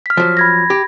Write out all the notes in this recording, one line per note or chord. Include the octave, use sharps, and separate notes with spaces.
F6 B6
F3 F#3
B5 G#6 A#6
G4